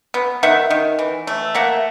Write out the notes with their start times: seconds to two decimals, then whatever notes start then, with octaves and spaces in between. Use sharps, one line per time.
0.14 B3
0.43 D#3 E5 F#5
0.70 D#3
0.99 E3
1.27 A3
1.55 A#3 E5 F#5